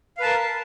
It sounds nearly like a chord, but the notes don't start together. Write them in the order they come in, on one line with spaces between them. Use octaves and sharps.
F5 B4 A5 A#4